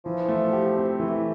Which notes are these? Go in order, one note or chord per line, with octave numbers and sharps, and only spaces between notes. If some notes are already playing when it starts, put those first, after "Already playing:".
E3 F3
A3
G4
C4
E3 A3